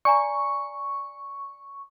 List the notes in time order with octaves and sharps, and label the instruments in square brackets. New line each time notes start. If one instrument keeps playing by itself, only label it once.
[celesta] D5 G#5 A#5 [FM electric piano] C#6